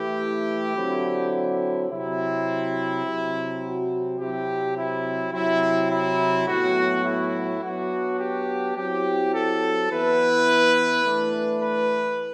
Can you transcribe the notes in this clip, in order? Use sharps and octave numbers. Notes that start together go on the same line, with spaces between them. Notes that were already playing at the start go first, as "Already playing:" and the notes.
Already playing: E3 A3 E4 G4
D3 F#3 C4 E4
C3 F#3 C4 E4
C3 F#3 C4
F#4
C3 F#3 C4 E4 G4
E4
C3 F#3 C4 E4
E4
A2 F#3 B3 F#4
E4
F#3 B3 D4 F#4
G4
F#3 C4 E4 G4
A4
E3 B3 E4 B4
E3 A3 D4
B4